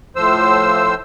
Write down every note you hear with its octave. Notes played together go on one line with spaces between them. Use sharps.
A2 F3 C5 E6